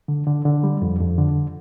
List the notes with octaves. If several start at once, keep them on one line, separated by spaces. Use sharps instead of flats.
D3
D3
D3
G3
F2
F2
D3